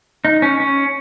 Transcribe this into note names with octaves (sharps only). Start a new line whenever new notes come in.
D#4
C#4
C#4